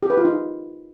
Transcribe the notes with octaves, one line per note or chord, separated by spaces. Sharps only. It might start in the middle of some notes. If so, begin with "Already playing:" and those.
G4
B4
F4
D#4